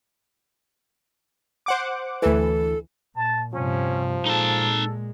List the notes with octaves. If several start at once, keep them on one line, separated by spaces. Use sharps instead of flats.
C5 F#5 D6
D2 E3 A4
A#2 A5
G2 C3 F3 C#4
A#2 G#3 D#4 A4 A5